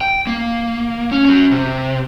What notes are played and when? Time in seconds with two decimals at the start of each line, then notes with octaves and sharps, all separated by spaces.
0.01 G5
0.27 A#3
1.11 C#4
1.25 C#4 F#4
1.52 C3